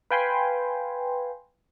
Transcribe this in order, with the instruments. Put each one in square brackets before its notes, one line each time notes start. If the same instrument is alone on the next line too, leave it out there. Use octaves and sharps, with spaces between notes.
[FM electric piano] B4 F5 G5 G#5 B5 C6